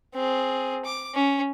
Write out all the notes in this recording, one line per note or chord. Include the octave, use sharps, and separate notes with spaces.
C4 G#4
D6
C#4